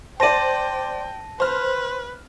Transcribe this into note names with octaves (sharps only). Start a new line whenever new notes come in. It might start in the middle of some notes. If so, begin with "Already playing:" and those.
C5 D5 G5 A5 A#6 D#7
B4 C5 F6